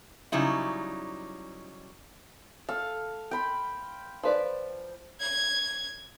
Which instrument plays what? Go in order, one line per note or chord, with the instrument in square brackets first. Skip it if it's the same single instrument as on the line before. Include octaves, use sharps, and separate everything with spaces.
[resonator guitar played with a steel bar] C#3 F#3 G3 D#4 E4
[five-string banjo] A4 [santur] F5
[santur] G5 B5 C6
[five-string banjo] F3 B4 D5
[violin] G#6